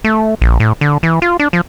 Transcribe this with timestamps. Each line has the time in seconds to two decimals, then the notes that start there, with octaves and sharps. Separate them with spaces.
0.04 A3
0.42 A#1
0.60 A2
0.81 D3
1.03 E3
1.22 F4
1.40 D4
1.53 F3